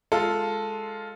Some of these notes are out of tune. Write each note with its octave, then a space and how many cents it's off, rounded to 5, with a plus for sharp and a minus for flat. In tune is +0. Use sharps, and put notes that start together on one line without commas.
G#3 +0 F4 +0 A4 +0